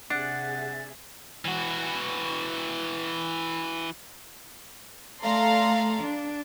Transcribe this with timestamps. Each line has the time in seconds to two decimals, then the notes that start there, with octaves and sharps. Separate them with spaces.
0.10 C3 D4 G#4 E5 F#5 A6
1.45 E3 F#4
5.21 A3 A4 D5 F5 A#5 C6
6.02 D4